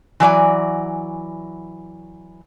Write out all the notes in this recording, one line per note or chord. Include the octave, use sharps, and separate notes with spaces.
E3 F#3 D5 G#5